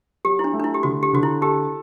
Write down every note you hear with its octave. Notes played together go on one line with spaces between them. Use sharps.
F#3 G4
E4
D4
A3
D4
E4
G4
D3 F#4
G4
D3 F#4
E4
G4 A4